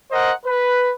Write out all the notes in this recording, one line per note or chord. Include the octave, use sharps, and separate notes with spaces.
A#4 C5 D#5 F#5
B4